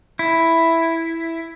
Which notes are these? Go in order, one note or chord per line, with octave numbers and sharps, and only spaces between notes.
E4